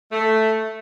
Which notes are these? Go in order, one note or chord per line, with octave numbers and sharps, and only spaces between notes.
A3